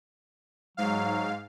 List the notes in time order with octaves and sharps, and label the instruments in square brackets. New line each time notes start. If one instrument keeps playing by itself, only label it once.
[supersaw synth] G#2 F5 [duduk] F#3